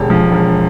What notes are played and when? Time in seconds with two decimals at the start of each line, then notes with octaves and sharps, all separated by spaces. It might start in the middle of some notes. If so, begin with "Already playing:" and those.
Already playing: E1 D3 G4
0.10 F3
0.32 E1